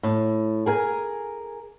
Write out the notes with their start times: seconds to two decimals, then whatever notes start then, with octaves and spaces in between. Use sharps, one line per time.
0.03 A2
0.66 G#4 A#4 G#5